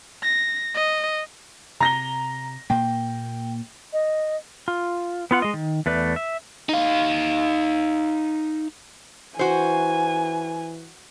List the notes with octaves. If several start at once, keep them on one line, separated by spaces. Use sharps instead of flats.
A#6
D#5
C3 A#5 A#6 G7
A#2 A#3 G5
D#5
F4
B3 F4 F#5
G#3 D#5
D#3
E2 A3 B4 D5
E5
D#4 F5
E3 F#4 C5 G#5